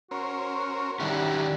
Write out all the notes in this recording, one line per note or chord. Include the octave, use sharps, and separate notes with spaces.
C#4 F#4 A#4 C5
D#3 G3 C#4 E4 F#5 A#5